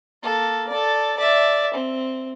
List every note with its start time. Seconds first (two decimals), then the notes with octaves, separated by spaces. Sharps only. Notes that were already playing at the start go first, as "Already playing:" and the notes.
0.23 A#3 A4
0.69 A4 D5
1.17 D5 E5
1.74 C4